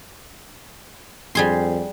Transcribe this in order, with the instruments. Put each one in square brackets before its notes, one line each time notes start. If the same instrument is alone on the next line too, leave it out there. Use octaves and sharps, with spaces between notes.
[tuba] F2 [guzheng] G3 G#4 C6